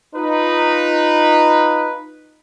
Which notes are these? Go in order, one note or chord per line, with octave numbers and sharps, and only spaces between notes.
D#4 F4 B4